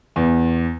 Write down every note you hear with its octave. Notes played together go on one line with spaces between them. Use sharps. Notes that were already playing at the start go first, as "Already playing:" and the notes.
E2